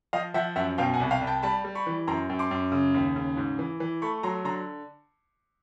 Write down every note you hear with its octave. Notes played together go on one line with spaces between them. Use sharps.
F3 D#5 F5
F3 E5 F#5
F#2 E5 F#5
B2 F5 G5
F#5 G#5
C2
F5 G5
C2
G5 A5
G3 A5 B5
G3
B5 C#6
E3
F#2 A#5 C6
F#2
C6 D6
F#2
C#3
D#2
C#3
G#2
E3
E3
A3 B5 C#6
F#3 A#5 C6
D3 A#5 C6